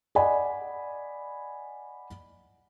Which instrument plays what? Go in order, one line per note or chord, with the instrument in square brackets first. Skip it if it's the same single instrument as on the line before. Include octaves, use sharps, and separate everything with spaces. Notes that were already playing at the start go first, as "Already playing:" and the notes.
[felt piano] D5 D#5 F#5 G#5 B5